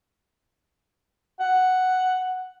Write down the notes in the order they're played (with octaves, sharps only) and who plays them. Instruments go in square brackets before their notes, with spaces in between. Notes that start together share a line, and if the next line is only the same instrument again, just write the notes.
[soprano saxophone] F#5